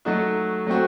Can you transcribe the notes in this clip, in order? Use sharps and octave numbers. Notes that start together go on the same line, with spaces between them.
F#3 A3 D#4 F#4
F#3 A3 C4 F#4